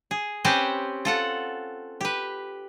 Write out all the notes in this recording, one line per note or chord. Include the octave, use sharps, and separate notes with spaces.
G#4
C4 C#4 G4 B4 C5
F4 A4 F#5
G4 B4